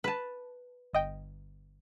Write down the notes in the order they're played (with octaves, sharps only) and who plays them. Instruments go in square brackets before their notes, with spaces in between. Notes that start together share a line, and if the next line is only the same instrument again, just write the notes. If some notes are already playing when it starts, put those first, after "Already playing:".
[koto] B4 A5
[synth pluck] G1 D#5 G5